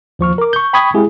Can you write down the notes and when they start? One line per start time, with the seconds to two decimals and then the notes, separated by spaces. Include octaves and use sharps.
0.19 D#2 F3 C#6 F6
0.38 A#4 D6
0.53 C#6 G6
0.73 G5 B5 C#6 D#6 G#6
0.94 G#3 C4 E4 G4 G#4